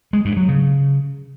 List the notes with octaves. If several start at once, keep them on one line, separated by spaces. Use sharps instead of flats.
G#3
G2
F#3
C#3